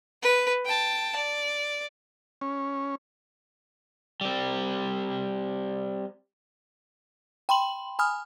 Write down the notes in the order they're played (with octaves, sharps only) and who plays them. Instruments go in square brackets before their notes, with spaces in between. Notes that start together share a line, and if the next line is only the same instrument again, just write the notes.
[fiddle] B4
G5 A5
D5
[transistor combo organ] C#4
[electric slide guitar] G3 C4
[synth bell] G5 B5 C6 F#7
G#5 B5 D#6 F6